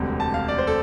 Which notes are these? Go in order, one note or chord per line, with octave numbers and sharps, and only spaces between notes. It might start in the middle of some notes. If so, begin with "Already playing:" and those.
Already playing: E1 D2 C3 G3 C4
A5
F5
D5
C5
A4